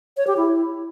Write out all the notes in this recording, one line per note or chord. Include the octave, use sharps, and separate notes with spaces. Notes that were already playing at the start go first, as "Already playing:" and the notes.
C#5
G4
E4